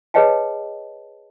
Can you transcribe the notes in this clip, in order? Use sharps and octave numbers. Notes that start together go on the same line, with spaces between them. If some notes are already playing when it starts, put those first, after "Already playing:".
G#4 B4 C#5 D#5 G5 A5